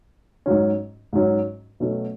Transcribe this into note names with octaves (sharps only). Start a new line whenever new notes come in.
G#2 F#3 C#4
G#2 F#3 C#4
B2 F#3 A3 C#4